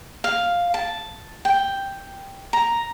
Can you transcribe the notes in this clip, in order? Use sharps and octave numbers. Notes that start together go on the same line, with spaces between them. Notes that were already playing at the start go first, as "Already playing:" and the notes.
F5
A5
G5
A#5